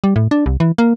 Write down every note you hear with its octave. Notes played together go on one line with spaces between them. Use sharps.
G3
A2
D4
C2
E3
A#3